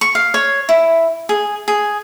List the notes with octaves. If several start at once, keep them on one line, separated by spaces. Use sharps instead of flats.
C#6
F5
C#5
E4
G#4
G#4